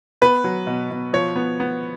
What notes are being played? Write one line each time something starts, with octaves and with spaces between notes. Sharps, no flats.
B3 B4
F#3
B2
B2
F3 C#5
B3
B3